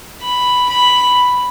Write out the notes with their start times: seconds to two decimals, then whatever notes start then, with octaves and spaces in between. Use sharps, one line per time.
0.22 B5
0.69 B5